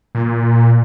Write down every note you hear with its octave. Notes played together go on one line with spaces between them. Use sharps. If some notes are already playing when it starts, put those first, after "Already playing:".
A#2